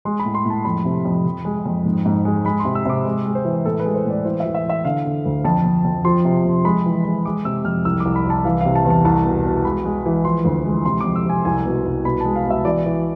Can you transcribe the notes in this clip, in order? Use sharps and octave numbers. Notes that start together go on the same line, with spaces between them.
G#3 C6
B5
A2
C6
A2
A5
F2 B5
C3
F2
F2
G#3
F2
G#2
G#2
G#3
G#3 B5
C6
C3
E6
C3 D6
G#3
G#3
C5
E3
A2 A4
B4
G#3
C5
A2
D5
E3 C5
E5
E3
E5
E3 E5
D3 F5
D3
D2
F2 A5
F2
F2
F3 C6
C3
F2
G#3 B5
E3
G#3
G#3 D6
C3 E6
F2 F6
C2 E6
C2 D6
B5
C2 A5
E3 F5
C3 F5
A5
E2
A5
C2 A5
B2
B2
G#3 B5
G#3
E3
F3 C6
D2
G#3
C3 C6
F2 D6
E6
C3 G#5
C2 G#5
B2
C2
B2 B5
G#3 A5
F5
B2
E5
E3 D5
E3